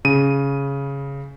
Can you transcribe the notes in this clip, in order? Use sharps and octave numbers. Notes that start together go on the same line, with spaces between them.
C#3 D#7